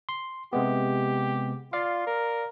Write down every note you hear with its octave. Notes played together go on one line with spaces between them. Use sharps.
C6
C3 G#3 B3 G4
F4 D5 F5
A#4